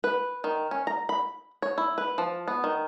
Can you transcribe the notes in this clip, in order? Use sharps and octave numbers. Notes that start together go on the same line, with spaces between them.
B4
D#3
C#4
A#5
B5
C#5
E4
B4
F3
B3
D#3